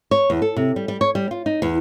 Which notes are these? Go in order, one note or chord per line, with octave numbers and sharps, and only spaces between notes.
C#5
E2
A4
C3
G3
G3
C#5
G3
F4
D#4
E2